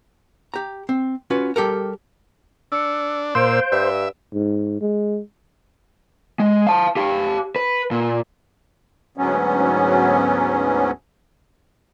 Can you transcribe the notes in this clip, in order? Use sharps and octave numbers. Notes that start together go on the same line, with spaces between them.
G4 A#5
C4
C#4 F4 F#4 B4
G3 G4 A4 A#4
D4 E6 C#7
A#2 C5 F5 E6 D7
G2 E5
G#2
G#3
G#3
F5 A5
G4 F5
B4
A#2
D2 G#2 F#3 B3 C#4